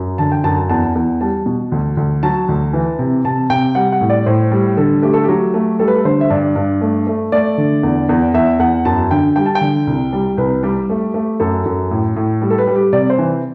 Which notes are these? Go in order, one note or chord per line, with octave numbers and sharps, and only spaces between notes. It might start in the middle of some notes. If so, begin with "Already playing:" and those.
Already playing: F#2
D3 A5
G5
F#2 A5
A5
E2 A5
E2
G3 A5
B2
D2
D2
F#3 A5
D2
E3
C3
C3 A5
C3 G5
G3 F#5
F#5
A2
D5
A2 C5
G3
D3 A4
A3 G4
A4
F#3 G4
A3
G3 A4
B4
A4
D3 C5
E5
G2 D5
G2
A3
A3
A3 D5
D3
E2
E2
E2 E5
E2 F#5
F#2 A5
D3 G5
G3 G5
A5
G5
D3
C2
G3
C2 B4
G3 G4
A3
A3
F#2 A4
F#2
A2
A2
G3
A4
B4
G3
G4
C3 D5
C5
E3